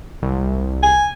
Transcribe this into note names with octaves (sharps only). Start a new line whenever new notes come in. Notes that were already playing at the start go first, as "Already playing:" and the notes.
C2
G#5